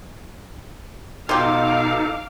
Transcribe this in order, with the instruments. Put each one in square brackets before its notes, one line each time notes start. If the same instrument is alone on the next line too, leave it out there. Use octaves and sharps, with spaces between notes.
[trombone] B2 [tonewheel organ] D#4 A4 [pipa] F4 G4 [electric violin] F5 D6